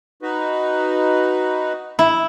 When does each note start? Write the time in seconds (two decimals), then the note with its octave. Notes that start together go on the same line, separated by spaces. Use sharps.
0.22 D#4 F#4 B4
1.99 E4